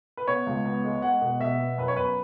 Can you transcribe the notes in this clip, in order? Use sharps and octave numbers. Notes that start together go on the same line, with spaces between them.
B4
B3 C#5
C#2
B3
G#3
G#3 F#5
B2
B2 E5
B3
F#2 B4
C#5
F#2 B4